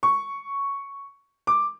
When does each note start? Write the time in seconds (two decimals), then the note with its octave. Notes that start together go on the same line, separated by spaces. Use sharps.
0.03 C#6
1.47 D6